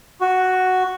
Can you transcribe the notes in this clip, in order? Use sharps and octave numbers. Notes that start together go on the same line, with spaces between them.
F#4